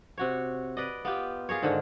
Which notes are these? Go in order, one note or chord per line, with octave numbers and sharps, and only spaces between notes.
C3 F#4 C#5
B4 D5 D#5
B3 F4 G4
F4 G#4 A#4 C#5
G#2 D3 D#3